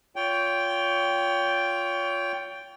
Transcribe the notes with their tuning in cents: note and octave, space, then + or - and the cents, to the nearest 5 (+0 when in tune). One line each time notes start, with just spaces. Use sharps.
F4 +5 C#5 +35 G5 +0